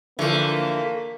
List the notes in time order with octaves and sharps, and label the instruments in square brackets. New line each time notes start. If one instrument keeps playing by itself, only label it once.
[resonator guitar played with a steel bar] D3 F3 [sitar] E3 A3 [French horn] A#3